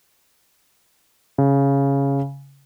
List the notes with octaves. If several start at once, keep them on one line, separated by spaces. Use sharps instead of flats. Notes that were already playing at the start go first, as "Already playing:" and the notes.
C#3